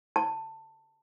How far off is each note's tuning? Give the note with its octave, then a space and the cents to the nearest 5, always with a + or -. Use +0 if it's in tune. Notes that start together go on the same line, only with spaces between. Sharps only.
A5 +20